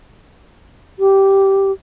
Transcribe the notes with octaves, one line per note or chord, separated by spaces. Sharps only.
G4